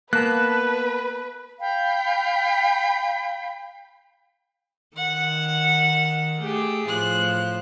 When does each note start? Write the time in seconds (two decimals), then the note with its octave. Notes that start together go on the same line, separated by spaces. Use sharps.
0.13 A#3 B3 B4 A5 F#6
1.59 F5 G5 B5
4.97 D#3 F#5
6.42 A3 G4 G#4
6.88 A2 F3 F#6